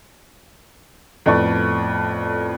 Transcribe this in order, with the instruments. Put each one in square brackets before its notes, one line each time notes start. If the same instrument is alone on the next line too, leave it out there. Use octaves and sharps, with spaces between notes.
[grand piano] F2 A2 B3 D5 A5 C#6